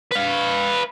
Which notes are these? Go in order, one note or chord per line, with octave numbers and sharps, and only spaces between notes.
B4 F5